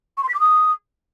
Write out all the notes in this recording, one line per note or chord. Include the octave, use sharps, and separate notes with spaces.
C#6
C6
B6
D6
D#6